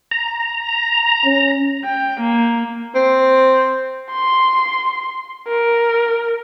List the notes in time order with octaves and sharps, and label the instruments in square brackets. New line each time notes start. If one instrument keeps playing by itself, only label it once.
[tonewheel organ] A#5
[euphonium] C#4
[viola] G5
A#3
[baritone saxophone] C4
[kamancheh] C6
A#4